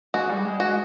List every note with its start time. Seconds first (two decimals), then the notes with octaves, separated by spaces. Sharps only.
0.14 G#3 F#4
0.29 G3
0.45 G#3
0.60 G#3 F#4